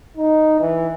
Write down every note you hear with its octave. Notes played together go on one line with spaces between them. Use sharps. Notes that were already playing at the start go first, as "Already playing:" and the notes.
D#4
E3